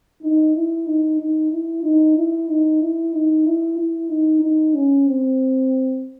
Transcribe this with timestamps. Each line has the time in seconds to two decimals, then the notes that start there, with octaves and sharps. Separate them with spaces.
0.22 D#4
0.55 E4
0.86 D#4
1.19 D#4
1.51 E4
1.83 D#4
2.16 E4
2.48 D#4
2.81 E4
3.13 D#4
3.46 E4
3.78 E4
4.09 D#4
4.42 D#4
4.74 C#4
5.07 C4